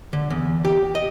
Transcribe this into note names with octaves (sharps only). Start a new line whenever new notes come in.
D3
E2
G4
D#5